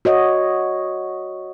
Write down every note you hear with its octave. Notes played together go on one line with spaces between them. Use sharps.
F#4 C#5 D#5